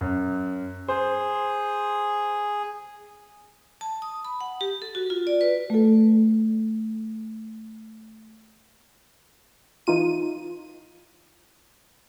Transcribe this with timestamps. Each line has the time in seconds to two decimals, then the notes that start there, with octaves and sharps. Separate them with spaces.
0.01 F#2
0.88 G#4 C5
3.81 A5
4.02 D#6
4.25 B5
4.41 F#5
4.61 G4
4.82 A4
4.95 F#4
5.10 F4
5.27 D5
5.41 B4
5.70 A3 A4
9.87 E3 D#4 F4 D#7